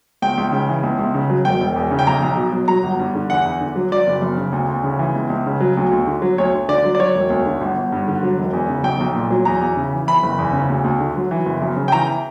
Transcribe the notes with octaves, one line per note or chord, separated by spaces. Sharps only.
C#2 G5
C#2
C#3
E3
C#2
C#2
C#3
F#3
E1 G5
E1
E2
C#3
G5
B1 A#5
B1
B2
F#3
F#3 A#5
G1
G2
D3
E2 F#5
E2
D3
F#3
F#3 D5
F#1
F#2
C#3
D2
D2
C#3
E3
C#2
C#2
C#3
F#3
D2
D2
D3
F#3
D2 C#5
D2
D3 D5
F#3
D5
F#3 C#5
E1
D2
D3
G1
G1
G2
D3
F#3
E1
E2
C#3
B1 G5
B1
A#2
F#3
E2 A#5
E2
C#3
E3
E3 B5
F#1
E2
C#3
D2
D2
D3
F#3
E3
F#1
F#2
C#3
G5
E3 A#5